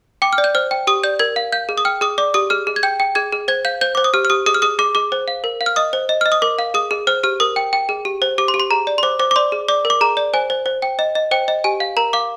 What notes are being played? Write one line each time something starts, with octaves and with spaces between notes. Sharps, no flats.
G5 D6
F6
D5
G6
C5 F6
G5
G4 D#6
D5 G6
A#4 G#6
F5
F5 G6
G#4
D#6
G5 F6
G#4 D#6
D5 D6
G4 D#6
G#4 F6
G#4
G#6
G5 G6
G5
G#4 G#6
G#4
C5 G#6
F5 G6
C5 G6
C5 D6
D#6
G4 F6
F6
G4 D#6
G#4 D#6
F6
G#4 D#6
G#4 D6
G#4 D6
C5
F5
A#4
F5
F6
D#5 D#6
C5
D#5
D#5 F6
D#6
A#4 D6
F5
G#4 D#6
G#4
C5 F6
G4 F6
A#4 D#6
G5
G5
G#4
G4
C5
G4 D6
C6
G4
C6
G#4 A#5
D5
C6
C5 D6
C5 D6
D6
D5 C6
G#4
D5 D6
A#4
D6
G#4 A#5
D5
C5 G#5
C5
C5
G5
D#5
D#5
C5 G5
D#5
G4 G#5
F5
A#4 A#5
F5 D6